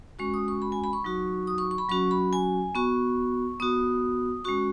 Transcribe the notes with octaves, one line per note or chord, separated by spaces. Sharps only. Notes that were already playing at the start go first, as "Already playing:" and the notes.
G#3 C#4 F#4 C#6
D#6
C#6
B5
G#5
B5
C#6
F#3 D#4 F#4
D#6
C#6
C#6
B5
F#3 C#4 F#4 C#6
B5
G#5
B3 F#4 C#6
B3 F#4 D#6
G#3 C#4 F#4 C#6